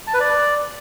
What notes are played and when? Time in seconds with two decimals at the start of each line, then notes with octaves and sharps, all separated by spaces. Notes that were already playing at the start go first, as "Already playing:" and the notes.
0.07 A5
0.14 B4
0.20 D5